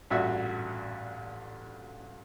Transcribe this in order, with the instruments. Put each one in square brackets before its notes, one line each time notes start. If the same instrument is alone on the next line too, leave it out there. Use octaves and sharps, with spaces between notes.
[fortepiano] A1 G2 A#2 F#4 E5